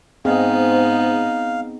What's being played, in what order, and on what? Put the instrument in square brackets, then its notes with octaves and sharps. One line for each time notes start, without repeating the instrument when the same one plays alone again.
[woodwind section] G#2 [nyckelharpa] B3 D#4 [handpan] C4 G#4 [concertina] F5